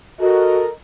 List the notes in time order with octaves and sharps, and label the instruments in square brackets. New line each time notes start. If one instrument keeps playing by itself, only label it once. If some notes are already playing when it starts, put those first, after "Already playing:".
[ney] F#4 [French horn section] A4 A#4 D#5